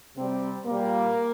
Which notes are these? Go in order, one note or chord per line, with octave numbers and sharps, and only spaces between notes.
C3 G3 C4
A#2 G3 A#3